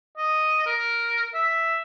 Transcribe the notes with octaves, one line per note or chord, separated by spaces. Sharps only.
D#5
A#4
E5